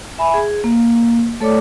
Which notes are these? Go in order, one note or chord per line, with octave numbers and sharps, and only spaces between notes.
E5 G#5 B5
G#4
A#3
A3 A4 C#5 D5 D6